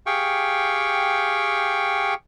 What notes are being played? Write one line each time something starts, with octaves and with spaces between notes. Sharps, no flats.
G4 G#4 F5 G5 C#6